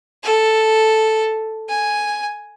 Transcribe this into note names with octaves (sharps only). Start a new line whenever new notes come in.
A4
G#5